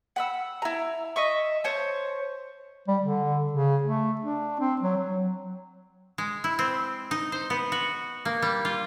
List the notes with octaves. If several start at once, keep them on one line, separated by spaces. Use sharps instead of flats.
F#5 B5 E6
E4 A#5
D#5 E5 C#6
C5 C#5 A5
G3
D3
C#3
A3
D4
C4
F#3
F#3
G#3
E4
C4
D#4
C5
B3
F#4
A#3
G3
F4